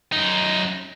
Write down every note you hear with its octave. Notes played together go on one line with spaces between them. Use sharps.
F#2 D#4